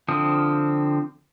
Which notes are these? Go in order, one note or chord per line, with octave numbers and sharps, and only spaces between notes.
D3 F3 C4 D#6